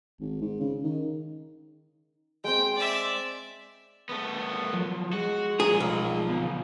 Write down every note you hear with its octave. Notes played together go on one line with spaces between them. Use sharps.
G#1
G#2
C#3
D#3
G#3 C4 G5
D5 E5
A3 B3
F3 F#3
G#3 F#4
F3 G#4 A#5
B1
B3 F4 F#4